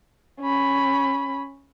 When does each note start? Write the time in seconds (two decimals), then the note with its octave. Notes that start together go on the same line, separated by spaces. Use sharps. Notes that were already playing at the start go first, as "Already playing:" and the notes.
0.41 C#4 B5